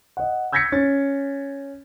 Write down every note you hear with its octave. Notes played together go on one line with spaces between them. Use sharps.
D#5 F#5
E6 G6 G#6 A#6 B6 C#7
C#4 A6